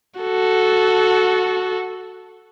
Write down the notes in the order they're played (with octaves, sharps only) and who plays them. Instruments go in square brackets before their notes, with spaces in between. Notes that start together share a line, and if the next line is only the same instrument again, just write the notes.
[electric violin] F#4 A4